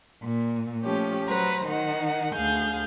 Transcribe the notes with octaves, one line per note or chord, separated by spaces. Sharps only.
A#2
F3 A3 C#4 G4
F#3 B4 C5 A#5
D#3 D#4 F#5
D2 G#4 F5 G6